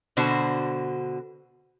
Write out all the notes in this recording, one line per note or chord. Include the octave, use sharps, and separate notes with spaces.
B2 D3 F#4 C5